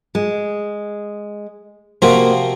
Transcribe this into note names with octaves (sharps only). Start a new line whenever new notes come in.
G#3
C3 F3 A#3 C4 F#4